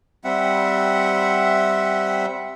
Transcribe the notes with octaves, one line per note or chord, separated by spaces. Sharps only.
G3 C4 E5 F#5